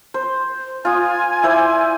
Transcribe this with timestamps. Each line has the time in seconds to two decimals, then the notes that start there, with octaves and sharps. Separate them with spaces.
0.14 C5
0.85 F4 G#5 D#6
1.43 E4 C5 D5